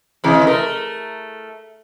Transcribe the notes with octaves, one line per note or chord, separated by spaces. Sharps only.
C3 E3 G#3
A3 A#4